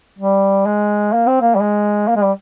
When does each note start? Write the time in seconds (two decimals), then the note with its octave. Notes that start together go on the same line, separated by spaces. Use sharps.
0.19 G3
0.66 G#3
1.13 A#3
1.27 C4
1.41 A#3
1.55 G3
1.61 G#3
2.08 A#3
2.16 G#3
2.24 G3